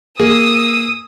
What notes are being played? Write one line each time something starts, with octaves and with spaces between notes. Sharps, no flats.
A#3 G#4 D#6 E6